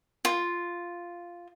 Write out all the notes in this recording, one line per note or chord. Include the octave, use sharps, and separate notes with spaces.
F4